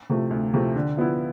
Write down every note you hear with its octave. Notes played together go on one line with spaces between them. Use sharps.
C3 F3 A3
D2
C3 F3 A3
D3
F3 B3 E4